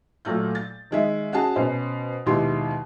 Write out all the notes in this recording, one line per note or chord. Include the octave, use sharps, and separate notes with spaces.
A#2 F#3 A3 G6
A6
D#3 G#3 E5
C#4 F#4 G#4 A5
B2 C#4 C5
D#2 B2 G#3 E4 G4 C6